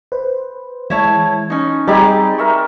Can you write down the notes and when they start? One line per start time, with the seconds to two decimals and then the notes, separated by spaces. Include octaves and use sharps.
0.12 B4 C5
0.90 E3 G#3 E4 C#5 A5
1.50 C#4 D#4
1.88 G3 C4 D#4 G4 G#4 D5 D#5 B5
2.38 A#4 E5 G5 C#6